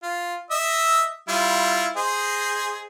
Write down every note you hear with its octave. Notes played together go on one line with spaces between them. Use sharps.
F4
D#5 E5 E6
G3 E4 F4
G#4 C5 D#5